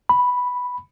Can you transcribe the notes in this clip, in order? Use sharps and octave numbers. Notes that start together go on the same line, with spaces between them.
B5